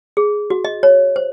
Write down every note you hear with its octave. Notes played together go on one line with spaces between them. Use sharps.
G#4
F#4
D#5
C#5
C5